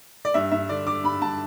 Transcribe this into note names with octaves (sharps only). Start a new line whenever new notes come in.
D5
G2 E5
G2 E5
D3 D5
D3 D6
G2 B5
G2 A5